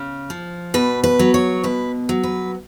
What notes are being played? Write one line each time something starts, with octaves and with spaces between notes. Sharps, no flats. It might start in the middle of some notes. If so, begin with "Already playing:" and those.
Already playing: C#3
F3
B2 B4
B4
F#3
C#5
B2 B4
F#3
B4